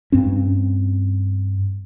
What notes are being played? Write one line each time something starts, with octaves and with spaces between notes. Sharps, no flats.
G2 C4 C#4